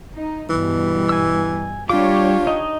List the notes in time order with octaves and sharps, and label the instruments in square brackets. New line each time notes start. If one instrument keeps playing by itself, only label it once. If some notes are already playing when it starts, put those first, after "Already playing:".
[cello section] D#4
[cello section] G2 B2 G3 [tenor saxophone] E3
[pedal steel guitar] G#5 E6
[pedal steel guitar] G3 D6 [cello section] D4 G4 C#5 [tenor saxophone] F4
[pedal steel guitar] D#4 D#5